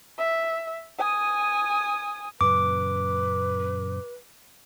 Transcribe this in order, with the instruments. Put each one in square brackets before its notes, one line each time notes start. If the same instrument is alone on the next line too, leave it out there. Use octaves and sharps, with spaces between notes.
[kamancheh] E5
G#5 D#6
[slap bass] F#2 A#2 C#3 [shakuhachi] B4 [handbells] D6